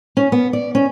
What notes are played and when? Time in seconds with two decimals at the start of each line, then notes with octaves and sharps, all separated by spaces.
0.17 C#4
0.32 B3
0.53 D5
0.75 C#4